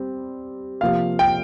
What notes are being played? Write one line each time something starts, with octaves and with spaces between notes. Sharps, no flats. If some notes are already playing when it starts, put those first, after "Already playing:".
Already playing: G3 C4
C3 F3 A#3 F5
G5